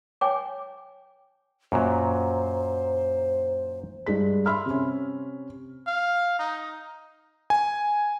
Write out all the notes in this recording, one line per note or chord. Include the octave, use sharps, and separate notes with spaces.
C#5 G5 G#5 D6
F#2 A#2 F#3 C5
G2 G#3 B6
E5 B5 C6 E6 F6
C3 C#4
F5
D#4
G#5